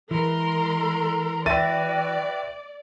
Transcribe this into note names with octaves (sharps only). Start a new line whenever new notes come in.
E3 G#3 A#4 A#5 C6
F#4 B4 D5 E5 G5 A6 D#7